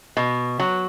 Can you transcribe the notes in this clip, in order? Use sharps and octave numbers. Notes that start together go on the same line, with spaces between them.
B2
F#3